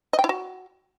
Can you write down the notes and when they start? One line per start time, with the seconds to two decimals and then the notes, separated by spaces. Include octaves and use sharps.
0.13 D#5
0.19 G5
0.24 E4
0.29 F#4